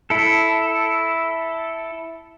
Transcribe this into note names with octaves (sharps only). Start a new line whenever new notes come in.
E4 A4